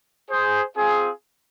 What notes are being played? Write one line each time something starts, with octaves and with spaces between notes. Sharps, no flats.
G#4 C5
C4 F4 G#4